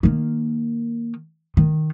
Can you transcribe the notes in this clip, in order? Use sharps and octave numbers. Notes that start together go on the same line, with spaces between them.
D#3 A#3
D#3